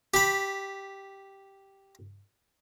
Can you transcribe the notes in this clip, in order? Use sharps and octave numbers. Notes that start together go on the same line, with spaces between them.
G4 B5